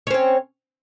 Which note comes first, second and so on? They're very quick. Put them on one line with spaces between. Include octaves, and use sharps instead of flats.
C#4 C4 C#5